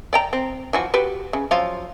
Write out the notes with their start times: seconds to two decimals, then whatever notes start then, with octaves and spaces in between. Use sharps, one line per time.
0.13 D5 G5 A#5
0.33 C4
0.73 E3 F3 F#4
0.94 F#4 G4 B4
1.33 C#3
1.51 F3 F#3 F4